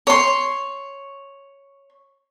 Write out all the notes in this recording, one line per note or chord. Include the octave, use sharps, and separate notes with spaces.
C#5 C6